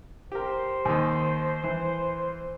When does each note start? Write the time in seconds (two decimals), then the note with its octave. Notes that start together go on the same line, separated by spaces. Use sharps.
0.32 G4 A#4 C5
0.85 D#2 D#3
1.64 E3